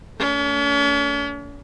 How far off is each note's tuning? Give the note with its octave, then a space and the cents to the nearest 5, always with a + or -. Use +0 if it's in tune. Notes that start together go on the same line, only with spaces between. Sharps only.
A3 +20 C#4 +45